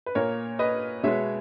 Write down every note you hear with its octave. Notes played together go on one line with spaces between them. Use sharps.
B4
A#2 A#3 A#4 C#5
B4 D#5
B2 G#3 B3 C#5 E5